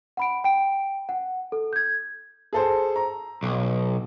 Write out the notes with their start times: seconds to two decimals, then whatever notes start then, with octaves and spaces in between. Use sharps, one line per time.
0.17 F#5 B5 D7
0.44 G5 D7
1.09 F#5
1.52 A4
1.73 G6 G#6
2.53 G#4 A4 C5
2.96 A#5
3.43 B1